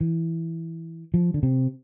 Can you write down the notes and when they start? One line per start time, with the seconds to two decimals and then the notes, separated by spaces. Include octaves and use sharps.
0.01 E3
1.14 F3
1.34 D3
1.43 C3